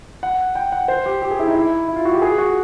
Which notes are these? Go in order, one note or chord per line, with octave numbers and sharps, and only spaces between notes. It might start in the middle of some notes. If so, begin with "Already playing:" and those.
F#5
G5
F#5
C5
G4
G4
G#4
E4
D#4
E4
E4
F4
F#4
G4
G#4
F#4